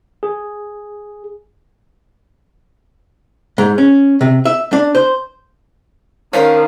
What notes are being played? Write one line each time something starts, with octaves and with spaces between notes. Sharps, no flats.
G#4
G#2
C#4
C3
E5
D4
C5
D#3 C#4 D4 A#4 C5 F5